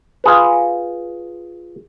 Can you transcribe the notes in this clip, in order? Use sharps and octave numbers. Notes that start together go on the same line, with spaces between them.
F4 G#4 B4